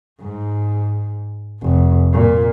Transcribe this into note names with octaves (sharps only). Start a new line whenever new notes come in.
G#2
F1
A#2